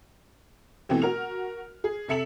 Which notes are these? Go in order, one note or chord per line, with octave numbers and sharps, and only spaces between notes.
B2 E3 A3 C4 G4
F#4 A#4 F6 F7
G#4
C3 A4 E5 C#7 E7 F#7